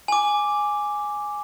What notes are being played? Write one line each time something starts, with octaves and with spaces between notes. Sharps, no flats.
G#5 D6